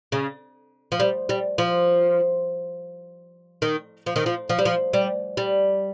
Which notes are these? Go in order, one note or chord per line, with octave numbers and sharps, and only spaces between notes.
C#3
F3
G3
G3
F3
D#3
F3
D#3
F3
F3
G3
F3
G3
G3